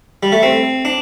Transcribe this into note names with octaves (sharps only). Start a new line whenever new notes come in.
G3
A3
C4
D4